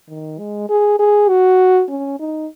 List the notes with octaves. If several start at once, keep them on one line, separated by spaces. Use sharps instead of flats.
D#3
G#3
G#4
G#4
F#4
C#4
D#4